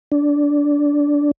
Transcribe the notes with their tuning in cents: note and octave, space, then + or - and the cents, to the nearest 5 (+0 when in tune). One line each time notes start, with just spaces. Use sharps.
D4 -15